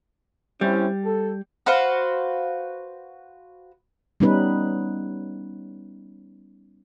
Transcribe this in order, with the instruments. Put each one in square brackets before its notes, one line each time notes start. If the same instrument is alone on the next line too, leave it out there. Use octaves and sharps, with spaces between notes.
[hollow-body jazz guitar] G3 [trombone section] C4 C#4 E4
[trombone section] A4
[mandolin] F#4 B4 C5 F5
[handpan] G3 B3 C#4 D#4 B4